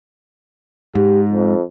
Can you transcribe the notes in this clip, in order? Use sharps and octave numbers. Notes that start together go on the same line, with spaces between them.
G#2 G4
F2